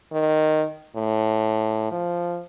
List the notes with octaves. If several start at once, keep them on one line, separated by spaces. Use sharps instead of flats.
D#3
A2
F3